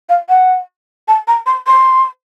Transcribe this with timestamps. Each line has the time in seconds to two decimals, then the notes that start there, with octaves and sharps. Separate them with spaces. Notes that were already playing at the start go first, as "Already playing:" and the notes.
0.09 F5
0.29 F#5
1.08 A5
1.27 A#5
1.46 C6
1.67 C6